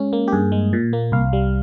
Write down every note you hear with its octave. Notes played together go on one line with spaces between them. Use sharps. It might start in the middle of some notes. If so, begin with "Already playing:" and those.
Already playing: G#3 C#4
A#3
G4
G2 G#4
G#3
A#2
A#3
C2 F5
G3